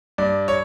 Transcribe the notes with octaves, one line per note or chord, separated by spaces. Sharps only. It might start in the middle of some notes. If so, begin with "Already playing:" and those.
G2 D5
C#5